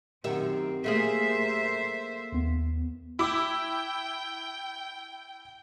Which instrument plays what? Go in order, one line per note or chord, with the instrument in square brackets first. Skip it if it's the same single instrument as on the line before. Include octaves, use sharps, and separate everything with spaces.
[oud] F#2 D#3 E5 [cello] C4 [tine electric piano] G4 A#4
[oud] A3 A#3 G#4 [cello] C5 E5
[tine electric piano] D#2 B3
[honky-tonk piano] E4 D6 [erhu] G5